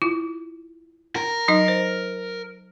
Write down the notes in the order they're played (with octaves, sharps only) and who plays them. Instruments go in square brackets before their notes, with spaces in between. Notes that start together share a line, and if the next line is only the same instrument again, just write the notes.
[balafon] E4 F4
[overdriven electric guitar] A#4
[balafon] F#3 D#4 D#5
C5